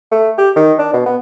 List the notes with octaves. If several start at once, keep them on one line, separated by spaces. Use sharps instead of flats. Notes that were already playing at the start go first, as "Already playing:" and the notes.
A3
G4
D#3
D4
B2
B3